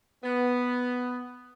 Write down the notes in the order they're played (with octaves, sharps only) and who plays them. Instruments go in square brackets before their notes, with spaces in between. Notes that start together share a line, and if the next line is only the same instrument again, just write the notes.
[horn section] B3